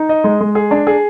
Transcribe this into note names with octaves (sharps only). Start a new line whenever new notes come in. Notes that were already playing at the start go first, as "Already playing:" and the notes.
Already playing: D#4
D#5
G#3
G#3
G#4
D4
G#4